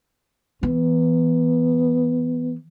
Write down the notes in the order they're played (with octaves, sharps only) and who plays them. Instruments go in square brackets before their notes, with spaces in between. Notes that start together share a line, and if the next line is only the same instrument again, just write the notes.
[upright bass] E3 [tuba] B3